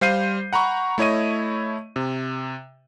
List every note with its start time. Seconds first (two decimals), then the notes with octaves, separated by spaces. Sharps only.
0.01 G3 C5 F5 G6 C7 D#7
0.53 F#5 A#5 B5 C#6
0.98 A3 E4 C#5 D#5 D#7
1.96 C3